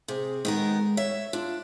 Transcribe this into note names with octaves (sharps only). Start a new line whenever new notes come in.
C3 G#4
D#3 G#3 B3 A#4
C#5 E5
D4 F4